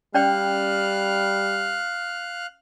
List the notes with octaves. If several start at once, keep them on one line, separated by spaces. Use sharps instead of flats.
G3 C#4 D5 F5 G5 F6 F#6